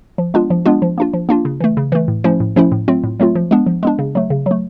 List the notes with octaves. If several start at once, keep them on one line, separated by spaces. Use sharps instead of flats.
F3
G#3 B3 D4 F4
F3
G#3 B3 D4 F4
F3
A#3 D4 F4
F3
A#3 D4 F4
C#3
E3 A3
C#3
E3 A3
A2
F3 A3 C#4 E4
A2
F3 A3 C#4 E4
A2
F#3 A3 C4 F4
A2
F#3 A3 C4 F4
F3
G#3 B3 D4
F3
G#3 B3 D4
C#3
F#3 A3
C#3
F#3 A3